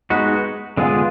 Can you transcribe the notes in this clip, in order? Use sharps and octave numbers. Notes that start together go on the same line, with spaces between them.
G#3 B3 D#4 F#4 B4
D3 G#3 B3 F4 G#4